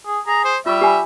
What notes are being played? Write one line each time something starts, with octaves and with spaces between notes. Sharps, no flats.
G#4
G#4 A#5
C5
G3 F4 E5 C#6
G4 G#5 B5